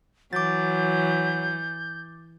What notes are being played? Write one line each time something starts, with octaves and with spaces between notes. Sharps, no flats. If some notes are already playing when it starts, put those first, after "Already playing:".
E3 F#3 D6 G6 A6